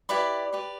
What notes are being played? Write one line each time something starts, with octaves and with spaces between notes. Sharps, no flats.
E4 G4 B4 D5 B5
G4 B4 D5